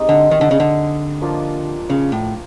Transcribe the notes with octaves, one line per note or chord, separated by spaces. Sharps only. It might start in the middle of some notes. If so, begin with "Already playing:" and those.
Already playing: G#3 C4 D#4 G4
D3
D#3
D3
C#3
D3
F3 A#3 D4 F4
C#3
A2